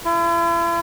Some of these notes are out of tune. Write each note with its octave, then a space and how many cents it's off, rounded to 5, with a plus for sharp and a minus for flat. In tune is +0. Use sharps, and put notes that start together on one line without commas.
E4 +45